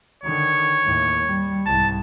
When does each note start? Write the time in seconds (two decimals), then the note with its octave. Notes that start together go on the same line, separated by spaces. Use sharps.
0.23 D3 D#3 C#5
0.84 D#2 A2
1.25 G3
1.66 C2 G#2 A5